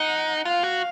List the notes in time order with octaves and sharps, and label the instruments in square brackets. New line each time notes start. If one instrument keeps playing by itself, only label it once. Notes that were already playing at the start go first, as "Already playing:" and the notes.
Already playing: [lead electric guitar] D#4 [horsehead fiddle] F#5
[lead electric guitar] F4 [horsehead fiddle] F5
[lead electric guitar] F#4